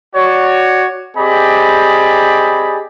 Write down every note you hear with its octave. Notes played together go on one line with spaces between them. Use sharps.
F#4 C#5 D5
C4 G4 G#4 D5 D#5 B5